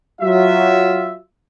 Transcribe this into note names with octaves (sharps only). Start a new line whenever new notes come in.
F#3 F4 E5